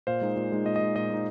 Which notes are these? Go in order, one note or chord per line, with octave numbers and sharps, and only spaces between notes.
A#2 C5 F5
G#3 D#4
A#2
G#3 D#4
A#2 D#5
D#5
G#3 D#4
A#2 D#5
G#3 D#4